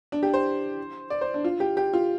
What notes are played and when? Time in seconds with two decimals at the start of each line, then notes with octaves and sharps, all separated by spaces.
0.12 D4
0.23 G4
0.34 C5
1.10 D5
1.21 C5
1.34 D4
1.44 F4
1.60 G4
1.77 G4
1.93 F4